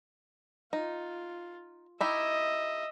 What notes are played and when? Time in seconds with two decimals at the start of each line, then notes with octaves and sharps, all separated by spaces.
0.73 D#4 F4
2.00 D#4 E4 G4 D#5 E5